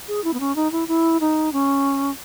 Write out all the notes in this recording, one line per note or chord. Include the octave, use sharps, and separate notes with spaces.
G#4
E4
B3
C#4
D#4
E4
E4
D#4
C#4